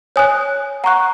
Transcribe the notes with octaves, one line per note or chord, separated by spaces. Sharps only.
C#5 G#5 D#6 F#6
F#5 A#5 C#6 F#6